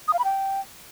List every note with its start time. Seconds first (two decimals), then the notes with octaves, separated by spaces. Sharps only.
0.08 D#6
0.13 F5
0.19 B5
0.24 G5